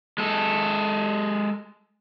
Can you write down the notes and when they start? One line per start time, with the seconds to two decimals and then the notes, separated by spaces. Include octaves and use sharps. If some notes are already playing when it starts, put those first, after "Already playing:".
0.18 G#3 A4